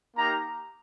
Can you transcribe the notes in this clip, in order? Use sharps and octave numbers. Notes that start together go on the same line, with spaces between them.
A#3 D#4 G4 A#5